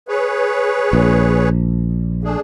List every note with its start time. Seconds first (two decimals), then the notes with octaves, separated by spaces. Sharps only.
0.08 G#4 B4 C#5
0.93 A#1
2.24 A3 D4 G#4